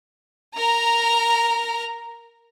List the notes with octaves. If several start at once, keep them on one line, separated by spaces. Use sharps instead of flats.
A#4 A#5